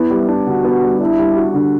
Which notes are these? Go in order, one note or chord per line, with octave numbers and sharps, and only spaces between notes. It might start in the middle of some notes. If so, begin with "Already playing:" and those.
Already playing: B3 E4
G3
D4
D3 F#4
B3
G3
D4 E4
G3
F#4
D3